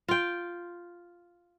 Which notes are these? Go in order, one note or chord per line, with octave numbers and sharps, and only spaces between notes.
F4 G5